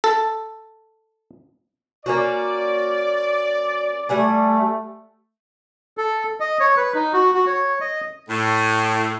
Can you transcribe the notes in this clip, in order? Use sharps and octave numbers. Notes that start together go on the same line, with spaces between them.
A4
A#3 C#4 F#4 D5
G3 A3 F#5 G#5
A4
D#5
C#5
B4
D#4
F#4
F#4
C#5
D#5
A2